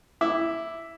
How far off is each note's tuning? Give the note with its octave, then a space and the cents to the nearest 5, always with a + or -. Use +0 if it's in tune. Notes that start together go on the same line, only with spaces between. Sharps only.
E4 +0 D6 +0